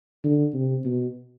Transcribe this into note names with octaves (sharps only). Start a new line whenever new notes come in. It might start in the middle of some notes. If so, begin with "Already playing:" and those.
D3
C3
B2